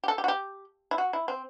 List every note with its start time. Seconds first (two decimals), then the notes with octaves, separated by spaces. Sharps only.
0.04 G4
0.08 A4
0.18 G4
0.24 F#4
0.28 G4
0.91 E4
0.98 F#4
1.13 E4
1.28 C4